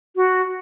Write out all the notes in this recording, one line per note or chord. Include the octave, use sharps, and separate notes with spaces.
F#4